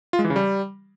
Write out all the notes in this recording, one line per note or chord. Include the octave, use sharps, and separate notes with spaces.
F4
G#3
E3
C#3
G3